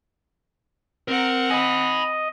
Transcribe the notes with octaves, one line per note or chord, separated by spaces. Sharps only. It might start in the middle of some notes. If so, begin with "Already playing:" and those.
C4 A#4 F#5
D#5 G#5 B5